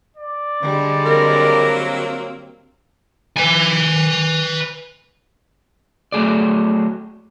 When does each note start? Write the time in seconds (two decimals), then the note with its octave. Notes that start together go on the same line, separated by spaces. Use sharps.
0.17 D5
0.61 D3 G3 G#3
1.06 F#3 A#3 C4 A#4
3.36 B4 G#5
6.12 F#3 A3 G#4 D5